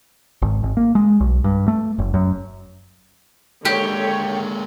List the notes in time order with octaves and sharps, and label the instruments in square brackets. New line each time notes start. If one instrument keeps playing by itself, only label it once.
[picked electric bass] G#1
G#1
A#3
G#3
B1
G2
A3
F#1
F#2
[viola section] D3 C#5 [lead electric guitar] G#3 A#3 [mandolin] G4